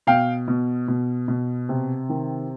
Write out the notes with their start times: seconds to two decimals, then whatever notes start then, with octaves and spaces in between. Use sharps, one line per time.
0.07 B2 F5 G5
0.48 B2
0.88 B2
1.28 B2
1.69 C3
2.09 D#3